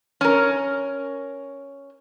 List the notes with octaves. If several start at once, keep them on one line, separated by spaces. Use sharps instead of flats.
C#4 A#4